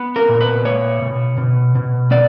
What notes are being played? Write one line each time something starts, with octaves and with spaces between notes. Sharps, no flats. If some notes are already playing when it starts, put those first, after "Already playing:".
Already playing: B3
A#4
A#2
B4
A#3 C#5
B2
B2
B2
B3 D5